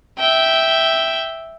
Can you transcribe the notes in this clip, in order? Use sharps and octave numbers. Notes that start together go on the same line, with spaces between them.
E5 G5